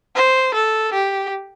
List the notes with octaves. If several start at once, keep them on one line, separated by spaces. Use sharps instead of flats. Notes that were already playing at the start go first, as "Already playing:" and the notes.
C5
A4
G4